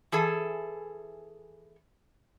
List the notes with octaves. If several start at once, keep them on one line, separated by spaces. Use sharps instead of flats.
E3 G#4 A4 G#5